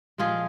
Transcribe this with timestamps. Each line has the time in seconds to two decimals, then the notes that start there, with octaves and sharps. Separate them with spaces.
0.18 A#2 F3 G#3 F4 G#4